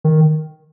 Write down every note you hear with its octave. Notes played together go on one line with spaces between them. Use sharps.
D#3